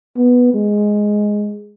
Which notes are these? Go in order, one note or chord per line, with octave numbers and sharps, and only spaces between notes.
B3
G#3